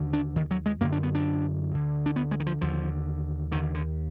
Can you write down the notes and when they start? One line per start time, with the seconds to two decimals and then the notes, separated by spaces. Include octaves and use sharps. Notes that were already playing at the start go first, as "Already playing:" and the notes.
Already playing: D#2 D3
0.13 D4
0.36 D#3
0.51 F#3
0.66 G#3
0.81 F#2 D3 A#3
0.92 D4
1.03 B3
1.15 D4
1.71 D2 D3
2.06 D4
2.16 B3
2.31 G#3
2.40 D#3
2.46 F3
2.61 D#2 D3 F3
3.51 D3 D#3
3.55 D#2
3.74 D3